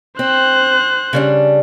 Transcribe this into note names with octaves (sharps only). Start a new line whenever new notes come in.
C4 C5 F#6
C#3 G3 D4